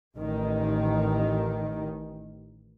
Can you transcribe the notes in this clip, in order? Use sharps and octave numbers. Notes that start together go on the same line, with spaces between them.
A1 D#3